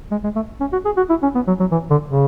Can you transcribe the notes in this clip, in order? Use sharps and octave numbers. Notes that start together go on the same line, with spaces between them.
G#3
G#3
A3
C#4
F#4
G#4
F#4
E4
C#4
B3
F#3
F#3
E3
D3
C#3